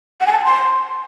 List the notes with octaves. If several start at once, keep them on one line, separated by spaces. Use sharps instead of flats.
F#5
G#5
A5
G#5
C6